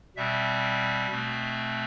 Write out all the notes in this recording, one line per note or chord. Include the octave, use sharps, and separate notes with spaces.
B2 G3 C4 E5
B2 A3 C4